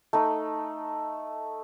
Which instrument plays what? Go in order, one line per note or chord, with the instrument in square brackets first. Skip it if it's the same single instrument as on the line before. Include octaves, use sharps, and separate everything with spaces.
[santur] A3 D#4